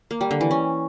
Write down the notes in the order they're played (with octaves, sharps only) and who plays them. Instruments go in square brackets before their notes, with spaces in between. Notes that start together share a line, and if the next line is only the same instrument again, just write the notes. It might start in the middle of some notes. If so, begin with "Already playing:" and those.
[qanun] A#3
G3
D3
E3
C#4